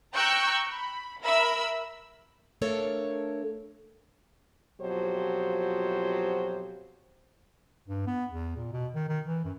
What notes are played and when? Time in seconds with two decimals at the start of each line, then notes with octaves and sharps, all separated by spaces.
0.14 G5 A#5 C#6 E6 F#6 G6
0.69 B5
1.22 A#4 E5 B5 E6
2.62 A3 D4 A4 A#4 C#5 F5
4.81 F2 B2 F3 F#3 G4 C5
7.88 G2
8.07 B3
8.31 E2
8.56 A#2
8.73 B2
8.95 D#3
9.09 D#3
9.26 E3
9.45 F#2